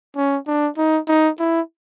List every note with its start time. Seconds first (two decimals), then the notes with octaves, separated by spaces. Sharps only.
0.16 C#4
0.47 D4
0.77 D#4
1.08 D#4
1.39 E4